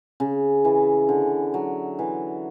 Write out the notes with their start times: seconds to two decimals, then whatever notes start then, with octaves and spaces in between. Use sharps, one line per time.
0.20 C#3
0.65 E3
1.09 D3
1.54 F#3
1.99 E3